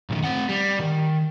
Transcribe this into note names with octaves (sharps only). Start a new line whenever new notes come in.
B1 D#3
C4 F#5
G3
D#3